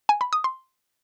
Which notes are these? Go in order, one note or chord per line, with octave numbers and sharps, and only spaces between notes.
G#5
B5
D#6
C6